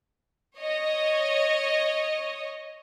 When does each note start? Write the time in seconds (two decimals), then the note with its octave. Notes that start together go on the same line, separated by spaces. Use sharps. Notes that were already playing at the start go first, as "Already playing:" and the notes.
0.59 C#5 D#5